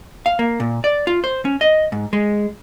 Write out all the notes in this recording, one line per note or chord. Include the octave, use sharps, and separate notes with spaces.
F5
A#3
A#2
D5
F4
C5
C#4
D#5
G#2
G#3